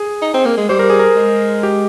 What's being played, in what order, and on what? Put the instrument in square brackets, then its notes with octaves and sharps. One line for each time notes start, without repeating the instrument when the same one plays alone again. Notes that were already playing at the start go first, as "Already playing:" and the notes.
Already playing: [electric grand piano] G#4
[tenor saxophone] D#4
C4
A#3
G#3
[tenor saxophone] G3 [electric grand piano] C5
[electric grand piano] A#4
G#4
A#4
[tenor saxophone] G#3
[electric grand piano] G4